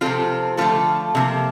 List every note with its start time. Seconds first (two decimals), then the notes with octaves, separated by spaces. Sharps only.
0.01 C3 F3 C4 F4 A4
0.57 D3 F3 A3 C4 F4 A4
1.15 C3 F3 A#3